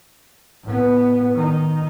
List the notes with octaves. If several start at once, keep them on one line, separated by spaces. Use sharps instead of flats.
A2 B3
D#3 D#4